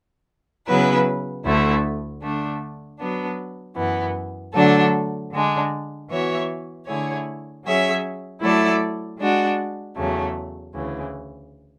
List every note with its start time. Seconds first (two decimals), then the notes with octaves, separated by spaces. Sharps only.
0.66 C#3 F#3 B3 E4 B4
1.43 D2 D3 A3 E4
2.21 D3 A3 D4
2.98 F#3 B3 D4
3.76 F#2 E3 B3
4.53 D3 F#3 A3 D4 A4
5.31 D3 G#3 D4
6.08 E3 B3 F#4 C#5 E5
6.86 D3 A3 E4 G#4 C#5
7.63 F#3 C#4 G#4 C#5 E5
8.41 F#3 A3 E4 A4 D5
9.19 G#3 D4 F#4
9.96 E2 C#3 F#3 A3
10.73 D2 C#3 E3